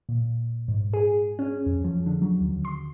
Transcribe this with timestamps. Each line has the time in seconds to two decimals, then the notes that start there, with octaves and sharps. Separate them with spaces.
0.09 A#2
0.68 G#2
0.93 G#4
1.39 C#4
1.66 F2
1.84 F3
2.06 D3
2.22 F#3
2.41 D#2
2.65 C6